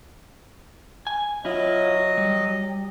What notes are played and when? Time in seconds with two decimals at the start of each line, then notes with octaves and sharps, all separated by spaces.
1.07 G#5
1.45 F#3 E4 F4 D#5
2.18 G3